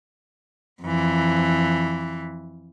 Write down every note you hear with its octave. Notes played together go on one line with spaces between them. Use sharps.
F2 E3